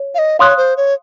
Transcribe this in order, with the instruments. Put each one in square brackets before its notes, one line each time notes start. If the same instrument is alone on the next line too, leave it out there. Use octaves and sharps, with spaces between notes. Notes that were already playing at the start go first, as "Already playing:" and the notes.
Already playing: [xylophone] C#5
[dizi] F5
D#5
[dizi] C#5 [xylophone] F5 C6 D#6 F#6
[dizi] C5
C#5